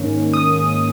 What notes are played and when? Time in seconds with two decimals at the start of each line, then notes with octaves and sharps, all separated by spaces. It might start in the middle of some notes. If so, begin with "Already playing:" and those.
Already playing: G#2 D#3 A#3 C#4
0.34 D#6